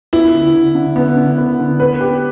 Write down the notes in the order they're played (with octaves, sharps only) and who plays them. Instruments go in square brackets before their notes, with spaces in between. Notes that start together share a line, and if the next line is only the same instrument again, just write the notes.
[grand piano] B3 [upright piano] E4
[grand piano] D3
D3
D3
[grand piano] D3 [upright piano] B3
[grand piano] D3
B3
D3
[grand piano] B3 [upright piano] B4
[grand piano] G4